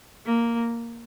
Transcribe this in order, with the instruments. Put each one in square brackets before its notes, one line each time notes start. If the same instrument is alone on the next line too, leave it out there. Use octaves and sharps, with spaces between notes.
[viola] A#3